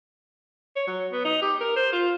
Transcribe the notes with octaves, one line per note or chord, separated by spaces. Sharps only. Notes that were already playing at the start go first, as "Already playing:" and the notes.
C#5
F#3
B3
D#4
G4
A#4
C5
F4